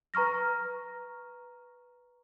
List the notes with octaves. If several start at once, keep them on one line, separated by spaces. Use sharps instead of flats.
B4 A#5 C#6 F6 A#6